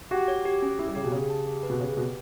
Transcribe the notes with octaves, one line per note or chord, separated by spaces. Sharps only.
F#4 G4
C#5
G4
C#4
E4 G4
G3
C#3 G4
B2
C#3 G4
A5
G4
B4
B2
C#3 G4
B2 B4